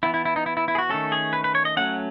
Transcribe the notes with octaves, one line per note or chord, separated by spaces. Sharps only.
E3 B3 E4
E4
E4
D#4
E4
E4
E4
G#4
F#4
D#3 A3 C#4 A4
G#4
B4
B4
C#5
D#5
F#3 A3 C#4 F#5